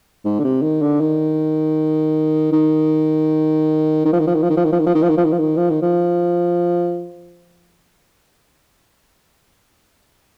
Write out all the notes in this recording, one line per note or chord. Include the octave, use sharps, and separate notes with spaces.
G#2
D3
C3
D#3
D3
D#3
D#3
D#3
F3
D#3
F3
D#3
F3
D#3
F3
D#3
F3
D#3
F3
D#3
F3
D#3
F3
D#3
F3
D#3
F3
D#3
F3